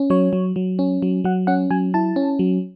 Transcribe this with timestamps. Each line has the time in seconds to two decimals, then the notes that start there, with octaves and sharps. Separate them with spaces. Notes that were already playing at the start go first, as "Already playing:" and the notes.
Already playing: C#4
0.10 F#3 C#5
0.33 F#3
0.56 F#3
0.79 C#4
1.02 F#3
1.24 F#3 F#5
1.47 C#4 F#5
1.71 F#3 G#5
1.94 E4 A5
2.16 C#4
2.39 F#3